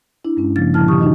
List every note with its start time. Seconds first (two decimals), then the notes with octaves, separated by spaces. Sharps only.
0.25 D4 E4
0.37 G2 G#3 C#4
0.56 C#3 F3 A#3 D4 A6
0.74 A#2 D3 F3 E4 A5 F6
0.88 D#3 G4 C#6 D#6
1.00 D4 D#4 F#4 D#5